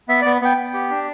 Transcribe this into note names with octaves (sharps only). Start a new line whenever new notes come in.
B3 E5
B3 D5
B3 G5
B3
G4
D4